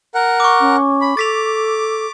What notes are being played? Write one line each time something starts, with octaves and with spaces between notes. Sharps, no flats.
A#4 F#5
C#6 D6
C#4
B5
A4 D6 A6 B6 F7